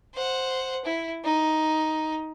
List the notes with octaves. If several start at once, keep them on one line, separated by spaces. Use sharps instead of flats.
C5 F#5
E4
D#4